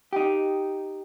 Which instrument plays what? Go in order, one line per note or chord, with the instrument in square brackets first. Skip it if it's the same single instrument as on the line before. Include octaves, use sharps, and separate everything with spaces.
[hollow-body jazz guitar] D#4 G4